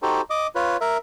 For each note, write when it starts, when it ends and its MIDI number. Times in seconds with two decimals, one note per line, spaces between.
0.03 0.21 63
0.03 0.21 66
0.03 0.21 67
0.03 0.21 69
0.03 0.21 72
0.30 0.47 75
0.30 0.47 86
0.55 0.77 65
0.55 0.77 71
0.55 0.77 73
0.81 0.97 70
0.81 0.97 76